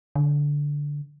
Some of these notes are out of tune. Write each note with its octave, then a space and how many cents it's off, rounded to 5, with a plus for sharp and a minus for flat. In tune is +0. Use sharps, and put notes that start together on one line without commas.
D3 -10